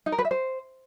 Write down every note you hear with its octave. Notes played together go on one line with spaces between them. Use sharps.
D#4
A#4
B4
E5
C5